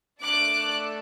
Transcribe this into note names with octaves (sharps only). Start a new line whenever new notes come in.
A3 D4 A4 D6 F#6